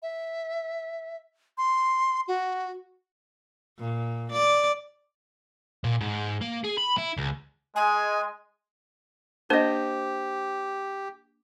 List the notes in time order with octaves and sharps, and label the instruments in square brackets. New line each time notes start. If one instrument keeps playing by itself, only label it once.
[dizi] E5
C6
F#4
[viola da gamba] A#2
D5
[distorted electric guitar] A#2
G#2
A#3
G#4
B5
E4
C#2
[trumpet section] G#3 [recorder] G#5
[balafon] A#3 D4 [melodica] G4 [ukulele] C5 D#5